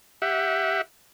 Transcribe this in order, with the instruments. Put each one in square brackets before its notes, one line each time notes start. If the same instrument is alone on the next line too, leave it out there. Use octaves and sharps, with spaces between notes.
[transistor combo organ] G4 E5 F#5